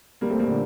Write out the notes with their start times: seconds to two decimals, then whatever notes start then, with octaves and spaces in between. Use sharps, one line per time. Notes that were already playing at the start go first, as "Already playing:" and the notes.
0.21 G3 A#3
0.30 A3 C4
0.39 G3 A#3
0.47 A#2 D3